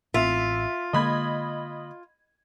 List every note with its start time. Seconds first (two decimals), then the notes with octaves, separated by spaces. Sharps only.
0.14 A1 A2 C4 F4 E5
0.93 D3 G#3 A#3 D#5 B5 G#6